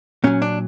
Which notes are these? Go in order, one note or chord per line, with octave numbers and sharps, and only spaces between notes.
A#2 F#3 C#4
D4